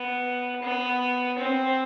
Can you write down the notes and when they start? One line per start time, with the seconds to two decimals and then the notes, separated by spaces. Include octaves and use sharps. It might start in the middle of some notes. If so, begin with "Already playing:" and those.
Already playing: B3
0.62 B3
1.38 C4